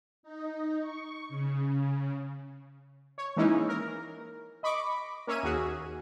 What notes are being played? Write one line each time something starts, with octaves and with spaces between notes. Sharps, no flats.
D#4
C#6
C#3
C#5
E3 G#3 A#3 C#4 D#4 E4
A#4
D#5 B5 C#6 D6
A#3 C#4 C#5 E5 D#7
D#2 F#4 G#4